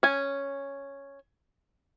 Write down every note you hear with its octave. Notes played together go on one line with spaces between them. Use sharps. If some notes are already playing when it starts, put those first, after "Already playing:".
C#4 G#5